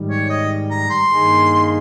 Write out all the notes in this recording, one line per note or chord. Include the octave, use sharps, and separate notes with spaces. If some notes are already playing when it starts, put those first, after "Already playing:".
Already playing: G#2 D#3 G3
C#5
D#5
A#5
C6
G2 D#3 A#3 D#4 G#4